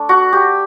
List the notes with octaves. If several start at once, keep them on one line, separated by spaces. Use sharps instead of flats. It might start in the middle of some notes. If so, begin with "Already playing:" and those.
Already playing: A3 D4
F#4
G4